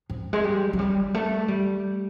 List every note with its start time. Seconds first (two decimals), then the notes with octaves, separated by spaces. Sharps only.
0.10 F3
0.33 G#3
0.44 G3
0.73 F#3
0.79 G3
1.14 A3
1.48 G3